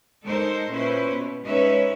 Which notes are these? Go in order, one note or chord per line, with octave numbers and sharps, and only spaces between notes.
G#3 D#4 A4 A#4 C5
A#2 C#4 E4 B4 C5
B2
G#3 C#4 D#4 B4 C#5 E5